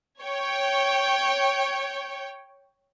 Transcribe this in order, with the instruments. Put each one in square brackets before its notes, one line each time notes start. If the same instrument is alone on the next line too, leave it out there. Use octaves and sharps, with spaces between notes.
[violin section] C#5 G5